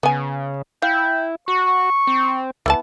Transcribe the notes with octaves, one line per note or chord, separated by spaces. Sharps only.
C#3 B3 G#5
E4 F5 G5
F#4 C#6
C4
C#2 E3 B3 A5